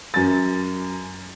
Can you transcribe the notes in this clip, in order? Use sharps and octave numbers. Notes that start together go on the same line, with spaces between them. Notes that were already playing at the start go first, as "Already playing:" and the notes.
F#2 A6